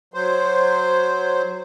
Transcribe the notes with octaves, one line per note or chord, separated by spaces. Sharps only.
F#3 C5